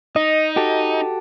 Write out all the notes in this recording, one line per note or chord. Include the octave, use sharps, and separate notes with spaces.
D#4 D#5
F#4 G4 A4